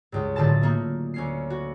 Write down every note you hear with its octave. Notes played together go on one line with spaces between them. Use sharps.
C#2 G2
B1 A2 D3 F4 A5 A6
A3 A#3 D#4
D2 C#4 C7
F#4